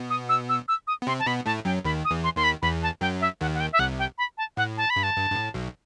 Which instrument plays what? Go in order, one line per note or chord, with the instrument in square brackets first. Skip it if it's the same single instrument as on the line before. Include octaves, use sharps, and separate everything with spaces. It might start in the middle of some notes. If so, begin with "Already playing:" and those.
Already playing: [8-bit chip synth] B2 B3
[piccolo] D#6
E6
E6
E6
D#6
[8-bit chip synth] B3
[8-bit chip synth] C3 C4 [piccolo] C6
[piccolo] A5
[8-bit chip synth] B2 B3 [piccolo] B5
[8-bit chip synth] A2 A3 [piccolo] A5
[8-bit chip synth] F#2 F#3 [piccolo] G5
[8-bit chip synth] D#2 D#3 [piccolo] B5
[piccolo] D#6
[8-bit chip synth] E2 E3
[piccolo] C6
[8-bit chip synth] D#2 D#3 [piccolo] C6
[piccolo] B5
[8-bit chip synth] E2 E3 [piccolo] B5
[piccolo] A5
[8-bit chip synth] F#2 F#3 [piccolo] G5
[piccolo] E5
[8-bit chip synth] D#2 D#3 [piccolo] F#5
[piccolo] F#5
G5
E5
[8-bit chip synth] C2 C3 [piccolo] F#5
[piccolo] G5
B5
A5
[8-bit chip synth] A2 [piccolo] F#5
[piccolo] A5
B5
[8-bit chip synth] G2
[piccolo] A5
[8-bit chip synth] G2
G2
A2
B1 B2